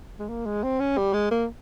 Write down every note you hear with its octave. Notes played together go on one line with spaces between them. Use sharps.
G#3
A#3
G#3
C4
C#4
G3
G#3
A#3